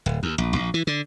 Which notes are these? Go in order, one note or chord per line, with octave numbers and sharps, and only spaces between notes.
D1
D#2
A#1
A#1
E3
D3